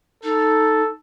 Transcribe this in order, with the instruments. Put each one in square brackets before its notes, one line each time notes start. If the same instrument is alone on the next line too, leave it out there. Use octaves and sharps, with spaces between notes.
[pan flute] D#4 [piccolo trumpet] A4